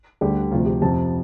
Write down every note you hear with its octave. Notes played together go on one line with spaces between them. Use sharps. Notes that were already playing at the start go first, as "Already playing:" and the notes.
D2 D3 G3 G4
D2 C3 F3 F4
G4
F2 C3 F3 A5